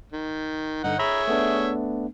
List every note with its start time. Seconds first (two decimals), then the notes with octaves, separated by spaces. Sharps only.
0.12 D#3
0.84 G2 D3 D#4 F#5
0.99 G#4 C#5 E5 A#5 B5
1.27 A3 B3 D4